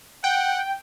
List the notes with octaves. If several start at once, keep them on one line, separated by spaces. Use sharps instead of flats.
F#5 G5